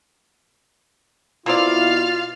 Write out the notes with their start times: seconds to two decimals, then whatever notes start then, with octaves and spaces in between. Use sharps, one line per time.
1.46 B2 A#3 C4 E4 F4 D5 F5 F6